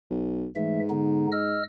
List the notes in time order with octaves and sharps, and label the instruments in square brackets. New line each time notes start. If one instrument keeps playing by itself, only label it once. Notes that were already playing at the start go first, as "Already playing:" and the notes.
[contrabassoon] B1
[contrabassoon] G#2 [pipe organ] E3 A3 E5
[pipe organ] D3 B3 D#4
D#5 E6 F6